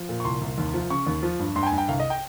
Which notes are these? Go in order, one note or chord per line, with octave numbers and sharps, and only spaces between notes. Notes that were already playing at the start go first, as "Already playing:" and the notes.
Already playing: F3
A#2
C#6
C2 C6
C2
D#2
F3
C#3 C#6
D#2
F3
G2
G2 C6
G5
G#5
G2
G5
C2 F5
D#5
G5